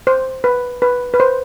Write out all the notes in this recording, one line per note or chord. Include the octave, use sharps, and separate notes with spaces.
C5
B4
B4
B4
C5